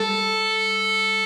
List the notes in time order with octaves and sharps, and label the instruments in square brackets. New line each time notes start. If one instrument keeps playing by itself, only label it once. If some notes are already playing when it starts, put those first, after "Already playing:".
Already playing: [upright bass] G3 [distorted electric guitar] A4